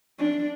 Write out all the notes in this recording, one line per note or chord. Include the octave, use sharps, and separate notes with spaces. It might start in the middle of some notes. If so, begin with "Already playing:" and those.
D4